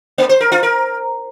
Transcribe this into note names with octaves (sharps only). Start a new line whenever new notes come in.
A#3
C5
A#4
F4
A#4